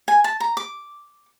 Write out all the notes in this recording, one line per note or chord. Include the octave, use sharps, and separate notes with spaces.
G#5
A5
A#5
D6